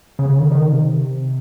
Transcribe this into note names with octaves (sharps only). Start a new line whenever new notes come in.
C#3
C#3
D#3
D#3
C3